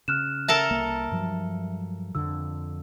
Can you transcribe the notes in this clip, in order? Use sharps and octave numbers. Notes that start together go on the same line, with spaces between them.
C#3 F6 F#6 E7
A4 A#4 E5 A5
C2 A#3
G2 F3 F#3
F2 D3 F3 E6